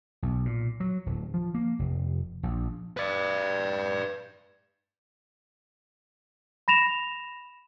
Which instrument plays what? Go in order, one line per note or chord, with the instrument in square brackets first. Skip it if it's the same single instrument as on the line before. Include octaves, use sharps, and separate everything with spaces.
[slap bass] B1
A#2
F#3
D1
F3
A#3
F1
A#1
[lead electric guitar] B4 D5
[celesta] B5 A#6 E7 F7